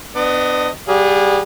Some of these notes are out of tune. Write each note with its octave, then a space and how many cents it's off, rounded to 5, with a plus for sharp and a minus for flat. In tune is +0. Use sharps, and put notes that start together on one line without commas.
B3 +35 D4 +25 D#5 +0
G3 -5 G#4 -25 F#5 -30